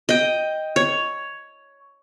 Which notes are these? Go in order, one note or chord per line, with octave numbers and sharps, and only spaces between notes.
D#5 G5
C#5